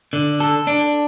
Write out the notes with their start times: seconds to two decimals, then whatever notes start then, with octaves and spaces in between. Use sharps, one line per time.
0.13 D3
0.40 A4
0.67 D4